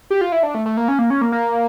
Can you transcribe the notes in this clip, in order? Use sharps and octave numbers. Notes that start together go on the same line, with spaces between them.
G4
F4
E4
D4
A3
A3
A#3
C#4
A#3
C#4
A#3
A#3